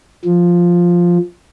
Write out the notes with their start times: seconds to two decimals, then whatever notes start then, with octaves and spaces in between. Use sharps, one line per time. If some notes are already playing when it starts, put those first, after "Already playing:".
0.25 F3